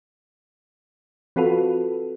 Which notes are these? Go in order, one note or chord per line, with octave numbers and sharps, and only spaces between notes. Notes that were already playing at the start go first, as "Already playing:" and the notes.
F3 C4 F4 F#4 A4 B4